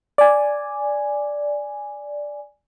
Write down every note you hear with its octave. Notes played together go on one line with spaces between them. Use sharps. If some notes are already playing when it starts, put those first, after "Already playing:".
D5 G#5